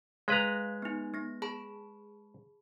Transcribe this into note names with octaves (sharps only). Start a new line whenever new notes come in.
G#3 B4 C#5 F5 A#5
B3 D#4
B3 A#6
G#4 A5 B5